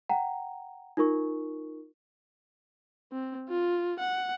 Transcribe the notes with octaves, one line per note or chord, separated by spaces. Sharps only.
F#5 G5 A#5
D#4 F4 A#4 C#6
C4
F4
F#5